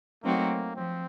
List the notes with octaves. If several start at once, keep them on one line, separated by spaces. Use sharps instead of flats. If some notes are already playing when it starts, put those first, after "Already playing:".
F#3 A3 A#3 C4 D#4 F#4
F3 C4